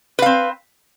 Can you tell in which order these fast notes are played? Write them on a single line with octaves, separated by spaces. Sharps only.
B4 F5 C4